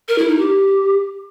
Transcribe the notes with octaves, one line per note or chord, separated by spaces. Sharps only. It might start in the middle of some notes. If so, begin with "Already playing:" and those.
A#4
E4
D#4
G4